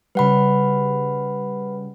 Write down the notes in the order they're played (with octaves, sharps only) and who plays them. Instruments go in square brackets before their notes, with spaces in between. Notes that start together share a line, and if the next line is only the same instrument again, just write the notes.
[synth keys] C#3 G3 [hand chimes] B4 F#5 B5